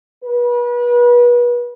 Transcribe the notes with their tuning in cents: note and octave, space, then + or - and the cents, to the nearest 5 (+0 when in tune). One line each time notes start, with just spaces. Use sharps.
B4 -35